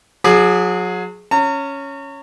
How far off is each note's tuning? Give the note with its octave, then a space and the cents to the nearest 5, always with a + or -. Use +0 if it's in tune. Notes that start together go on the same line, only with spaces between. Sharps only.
F#3 -30 G#4 +10 D6 +40
C#4 +0 A#5 -40